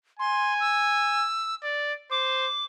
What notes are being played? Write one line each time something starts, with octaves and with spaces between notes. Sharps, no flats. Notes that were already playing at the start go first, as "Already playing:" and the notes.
G#5 C6
E6
D5
C5 D6